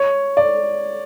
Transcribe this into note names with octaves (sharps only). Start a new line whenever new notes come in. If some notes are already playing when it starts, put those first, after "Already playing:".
Already playing: C#5
D5